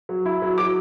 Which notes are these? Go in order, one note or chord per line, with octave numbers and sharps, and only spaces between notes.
F#3
E4
F#3
F#3 D6